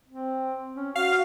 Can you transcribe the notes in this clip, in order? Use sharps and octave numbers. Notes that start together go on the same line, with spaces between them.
C4
C#4
F#4 F5